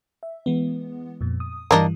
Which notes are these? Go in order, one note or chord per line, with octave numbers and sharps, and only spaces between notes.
E5
E3 G#3 B3
F2 A#2
D#6
G2 E3 G3 A#3 D4 D#4